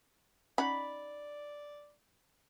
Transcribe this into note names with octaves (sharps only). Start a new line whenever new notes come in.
C#4 D#4 D5 F#5 B5